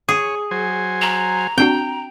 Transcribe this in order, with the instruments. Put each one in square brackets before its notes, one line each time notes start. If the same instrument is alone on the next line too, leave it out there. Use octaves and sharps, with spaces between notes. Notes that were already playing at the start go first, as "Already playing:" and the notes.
[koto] G#4 [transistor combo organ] C#5
[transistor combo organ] F#3 C5 G#5
[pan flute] A#5
[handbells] C4 D4 F#4 [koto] G5